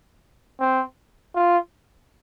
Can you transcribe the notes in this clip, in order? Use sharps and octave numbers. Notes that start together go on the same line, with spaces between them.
C4
F4